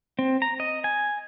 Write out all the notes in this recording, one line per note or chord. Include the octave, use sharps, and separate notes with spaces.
C4
A#5
D#5
G#5